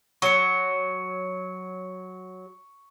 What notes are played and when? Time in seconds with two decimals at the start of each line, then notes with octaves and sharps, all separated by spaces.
0.22 F#3 C#6 C#7